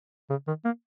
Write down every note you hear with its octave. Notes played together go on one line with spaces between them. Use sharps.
C#3
D#3
A#3